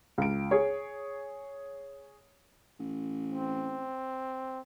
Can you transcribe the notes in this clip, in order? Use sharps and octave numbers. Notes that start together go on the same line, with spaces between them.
C#2 D7
G#4 C#5
A1
C4